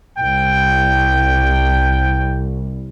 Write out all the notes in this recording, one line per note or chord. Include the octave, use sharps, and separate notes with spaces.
C2 G5